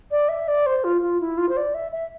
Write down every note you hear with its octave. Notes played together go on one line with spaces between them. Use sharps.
D5
E5
D5
C5
F4
F4
E4
F4
C5
D5
E5
E5